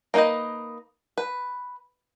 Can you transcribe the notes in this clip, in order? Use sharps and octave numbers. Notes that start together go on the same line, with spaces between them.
A#3 D#4 F#4 B4 D#5
B4